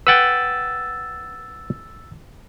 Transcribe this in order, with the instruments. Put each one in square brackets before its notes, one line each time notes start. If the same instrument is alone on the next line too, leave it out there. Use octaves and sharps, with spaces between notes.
[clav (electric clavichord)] B4 F#5 G5 [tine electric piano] E6 A6